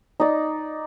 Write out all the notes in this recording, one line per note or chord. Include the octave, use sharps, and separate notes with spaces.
D#4 D5